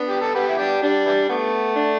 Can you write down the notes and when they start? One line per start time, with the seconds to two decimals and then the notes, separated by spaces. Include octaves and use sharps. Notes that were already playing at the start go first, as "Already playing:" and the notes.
Already playing: B3 D4
0.09 G4
0.22 A4
0.35 B3 G4 B4
0.49 E4
0.58 D4 G4
0.82 G3 D4
1.06 E3 G3
1.29 A3 B3
1.76 D4